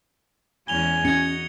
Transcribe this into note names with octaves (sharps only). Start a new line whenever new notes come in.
E2 G#3 C#4 G#5 F7 G7
C#4 D#4 F#4 G#6 C#7